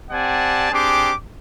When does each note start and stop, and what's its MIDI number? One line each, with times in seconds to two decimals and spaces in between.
0.11 0.72 60
0.11 0.72 67
0.11 0.72 74
0.11 0.72 78
0.11 0.72 80
0.11 0.72 81
0.72 1.13 60
0.72 1.13 62
0.72 1.13 67
0.72 1.13 68
0.72 1.13 84
0.72 1.13 86